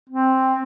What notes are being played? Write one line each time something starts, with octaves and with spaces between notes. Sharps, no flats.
C4